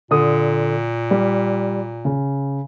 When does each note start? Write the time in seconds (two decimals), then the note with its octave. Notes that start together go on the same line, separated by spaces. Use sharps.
0.11 A#2 D3 D#6
1.11 G3
2.05 C#3